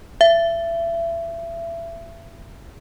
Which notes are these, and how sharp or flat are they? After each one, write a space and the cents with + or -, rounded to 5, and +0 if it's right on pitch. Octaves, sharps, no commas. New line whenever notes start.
E5 +30